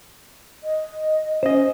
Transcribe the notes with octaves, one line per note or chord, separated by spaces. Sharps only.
D#5
C#4 C5 D#5